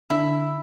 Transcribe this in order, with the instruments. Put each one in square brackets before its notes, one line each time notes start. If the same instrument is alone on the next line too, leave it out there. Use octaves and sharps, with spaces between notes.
[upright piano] D3 [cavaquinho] E4 E5